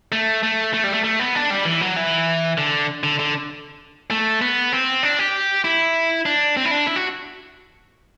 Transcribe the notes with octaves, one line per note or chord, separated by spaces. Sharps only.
A3
A3
A3
G3
A3
A3
B3
D4
G3
E3
F#3
E3
D3
D3
D3
A3
B3
C4
D4
G4
E4
D4
C4
E4
D4
E4
F#4